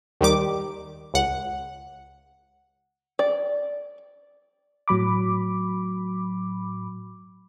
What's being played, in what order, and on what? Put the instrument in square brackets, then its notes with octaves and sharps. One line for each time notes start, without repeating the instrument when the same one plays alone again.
[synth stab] D#2 D#3 G3 D6
C#2 F#5
[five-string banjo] D5
[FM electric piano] A2 F#3 B5 D6